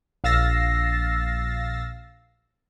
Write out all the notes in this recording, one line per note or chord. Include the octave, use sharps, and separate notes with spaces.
A#1 F5 E6 A6 A#6 C7